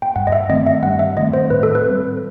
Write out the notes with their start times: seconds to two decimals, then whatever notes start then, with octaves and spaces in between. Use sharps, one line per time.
0.02 G5
0.16 G2 F#5
0.27 D#5
0.32 E5
0.49 D#3 A3 C4 D#5
0.66 E5
0.83 G2 F#5
0.99 E5
1.17 D#3 A3 C4 D#5
1.33 C5
1.50 A2 B4
1.63 A4
1.75 B4
1.84 C4
1.89 G3